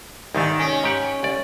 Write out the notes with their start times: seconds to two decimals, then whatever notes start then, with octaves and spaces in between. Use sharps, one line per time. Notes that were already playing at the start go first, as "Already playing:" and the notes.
0.35 C2 G#2 D#3 A3
0.59 C#4
0.84 G#2 G4 F#5
1.23 C2 D5